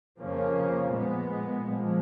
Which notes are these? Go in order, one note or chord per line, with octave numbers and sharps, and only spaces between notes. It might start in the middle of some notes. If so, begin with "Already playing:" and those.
F2 C#3 F3 A#3 C#4
A#2 G#3 B3
A#2 F3 G#3